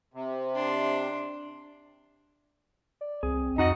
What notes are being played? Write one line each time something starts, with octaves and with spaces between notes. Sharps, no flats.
C3
D4 C6
D5
C2 C4 G#4
F2 D#4 F#4 D#5 F#5